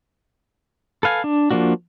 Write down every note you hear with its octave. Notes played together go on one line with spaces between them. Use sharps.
A4 B4 F5 G#5
D4
F3 A#3 D4 F#4